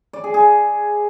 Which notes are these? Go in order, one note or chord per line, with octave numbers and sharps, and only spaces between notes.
D5
G#4
G#4